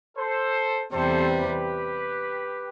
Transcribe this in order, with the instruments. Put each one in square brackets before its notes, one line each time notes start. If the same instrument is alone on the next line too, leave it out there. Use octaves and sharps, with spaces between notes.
[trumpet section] A4 C5
[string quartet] E2 C3 G3 C4 [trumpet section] A4 C5
[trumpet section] G4 B4